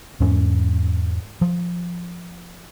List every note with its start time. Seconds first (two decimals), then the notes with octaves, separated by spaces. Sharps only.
0.20 E2 G#2 C#4
1.41 F3